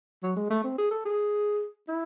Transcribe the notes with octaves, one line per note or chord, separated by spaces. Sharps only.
F#3
G#3
A3
C4
G#4
A4
G#4
E4